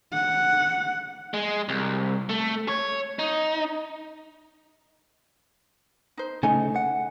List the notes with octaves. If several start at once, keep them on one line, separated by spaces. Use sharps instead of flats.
F#5
G#3
C2
A3
C#5
D#4
D#4 C5
C#3 A3 D#4 G#5
F#5